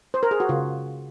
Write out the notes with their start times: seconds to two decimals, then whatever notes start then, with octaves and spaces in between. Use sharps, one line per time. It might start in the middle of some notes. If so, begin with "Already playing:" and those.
0.14 C5
0.23 A#4
0.31 G#4
0.40 F#4
0.49 C#3 F4